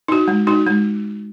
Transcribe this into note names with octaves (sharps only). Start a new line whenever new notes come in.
D#4 F#4
G#3
D#4 F#4
G#3